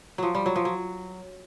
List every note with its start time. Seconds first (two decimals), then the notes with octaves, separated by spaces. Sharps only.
0.18 F3 F#3
0.35 G3
0.46 F#3
0.56 F3
0.65 F#3